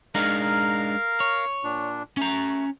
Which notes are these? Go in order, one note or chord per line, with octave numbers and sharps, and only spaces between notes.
G#3 D4 D#4 A#4 F5 A#5
C#5
A#2 D4
A3 C#4 A#5